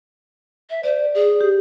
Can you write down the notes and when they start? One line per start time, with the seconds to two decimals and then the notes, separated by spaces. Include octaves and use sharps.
0.70 E5
0.83 C5 D5
1.15 G#4
1.41 G4